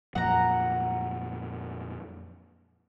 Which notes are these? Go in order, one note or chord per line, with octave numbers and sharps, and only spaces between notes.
F2 A#2 F#3 F#5 A#5